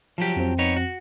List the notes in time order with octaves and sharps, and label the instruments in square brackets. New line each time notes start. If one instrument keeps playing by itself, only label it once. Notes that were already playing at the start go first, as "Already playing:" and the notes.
[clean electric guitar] F3 F#3 G4
[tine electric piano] F2 C4
[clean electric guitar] B3 D#4 C#5
F#4